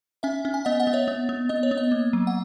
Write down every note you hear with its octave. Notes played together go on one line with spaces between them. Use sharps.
C#4 E5 G#5
C#4
G#5
B3 D#5 F#5
D#5 F#5
B3
C#5 E5
B3
B3
B3 D#5
C#5
B3
D#5
A#3
F#3
F#5